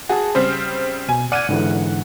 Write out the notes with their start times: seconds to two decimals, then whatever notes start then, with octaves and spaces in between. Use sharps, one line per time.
0.09 F#4 G#4 A5
0.35 C#3 G3 C4 C5 F6
1.09 B2 G#5
1.32 D5 F#5 F6 G#6 D#7
1.49 G#2 D3 E3